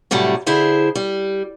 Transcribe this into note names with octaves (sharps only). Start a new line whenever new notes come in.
A2 C3 F#3 G3 A3
D3 E4 G#4 C5 E5
G3